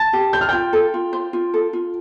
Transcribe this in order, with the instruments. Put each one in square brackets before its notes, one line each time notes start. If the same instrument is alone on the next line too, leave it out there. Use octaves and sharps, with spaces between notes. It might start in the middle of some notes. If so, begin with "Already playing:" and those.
Already playing: [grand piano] A5 A6
[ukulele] G4
[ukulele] C5 [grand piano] G6
[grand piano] F6
[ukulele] F4 [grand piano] G5 G6
[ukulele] A4
F4
C5
F4
A4
F4